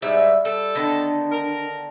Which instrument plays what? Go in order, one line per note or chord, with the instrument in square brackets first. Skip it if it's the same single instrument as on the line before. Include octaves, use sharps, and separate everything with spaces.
[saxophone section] G#2 [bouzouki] G3 E5
[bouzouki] G3 [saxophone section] A4
[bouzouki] D3 D#3 B3 [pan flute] D4
[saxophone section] A#4